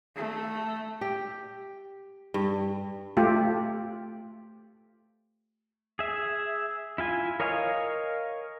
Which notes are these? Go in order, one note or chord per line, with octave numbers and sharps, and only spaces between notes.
A3
G4
G2
A3 F4 G4
G#4 E5
E4 F4 G#5
A#4 C#5 D#5 F5 G#5